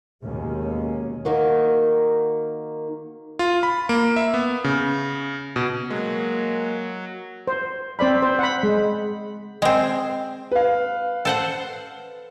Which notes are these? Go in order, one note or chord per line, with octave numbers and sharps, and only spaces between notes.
D#2 B2 G#3 A#3 C#4
D#3 A#3 F#4
F4
B5
A#3
E5
B3
C#3
B2
F#3 G#3 A#3
C5
C4 C5 D5 B5
C5
F#5 B5
G#3
G#3 C4
B4 F5
A4 C5 F#5